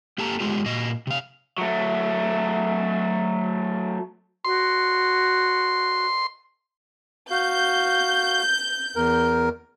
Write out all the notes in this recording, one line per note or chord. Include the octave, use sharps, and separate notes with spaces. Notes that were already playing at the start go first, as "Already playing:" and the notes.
A#3 G4 A4 A5 A#5
G#3 A3 B3 F4 G4
A#2 F#4 D#5
C3 F5
F#3 A3
F#4 C6
F#4 F5 G6
E2 A#4